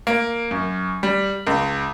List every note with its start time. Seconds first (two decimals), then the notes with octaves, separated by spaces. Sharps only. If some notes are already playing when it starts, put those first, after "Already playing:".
0.07 A#3
0.51 F#2
1.03 G3
1.47 C#2